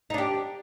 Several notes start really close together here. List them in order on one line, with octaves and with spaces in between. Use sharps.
D#4 D4 G4